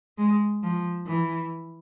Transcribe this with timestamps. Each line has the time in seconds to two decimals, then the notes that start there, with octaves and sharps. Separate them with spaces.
0.18 G#3
0.63 F3
1.06 E3